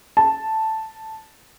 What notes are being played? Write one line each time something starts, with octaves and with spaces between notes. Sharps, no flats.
A5